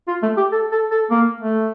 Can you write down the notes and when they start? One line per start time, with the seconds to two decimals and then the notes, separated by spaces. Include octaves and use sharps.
0.08 F4
0.23 A3
0.37 G4
0.52 A4
0.72 A4
0.91 A4
1.11 A#3
1.41 A3